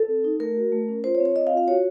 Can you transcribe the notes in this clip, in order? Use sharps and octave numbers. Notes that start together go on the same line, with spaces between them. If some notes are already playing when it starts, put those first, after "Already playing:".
Already playing: A4
C4
D#4
A3 A#4
F#4
A3
C#4
F4 C5
C#5
C4
C#5
C4 D#5
F5
F4
F5
F#4 C#5